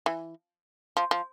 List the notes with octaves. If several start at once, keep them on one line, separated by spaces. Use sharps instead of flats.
E3
F3
F3